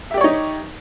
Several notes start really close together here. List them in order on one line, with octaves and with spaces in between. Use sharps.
E5 G4 D5 C#5 D#4